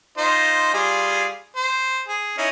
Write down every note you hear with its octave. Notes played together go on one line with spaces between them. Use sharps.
D#4 F4 C5
G3 F4 G#4
C5
G#4
C#4 D#4 E4